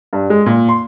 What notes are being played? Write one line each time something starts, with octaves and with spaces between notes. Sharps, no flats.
G2
G#3
A#2
C6